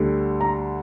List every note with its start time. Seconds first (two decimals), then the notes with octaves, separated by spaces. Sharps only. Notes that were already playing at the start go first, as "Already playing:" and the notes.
Already playing: D2 D3 G3
0.41 A#5